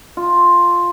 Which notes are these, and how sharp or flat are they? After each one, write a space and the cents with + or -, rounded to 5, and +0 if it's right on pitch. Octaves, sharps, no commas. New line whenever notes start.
F4 +5